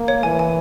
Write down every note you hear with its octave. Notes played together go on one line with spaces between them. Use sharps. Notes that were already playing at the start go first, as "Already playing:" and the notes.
Already playing: A#3
C#5
E3 G#5
G#5